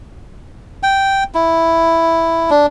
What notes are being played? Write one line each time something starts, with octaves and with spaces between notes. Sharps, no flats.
G5
E4
D4